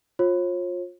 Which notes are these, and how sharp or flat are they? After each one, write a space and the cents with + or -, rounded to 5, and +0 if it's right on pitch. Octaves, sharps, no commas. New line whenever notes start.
F4 +25 C#5 -45